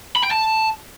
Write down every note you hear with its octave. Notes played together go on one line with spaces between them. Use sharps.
B5
G5
A5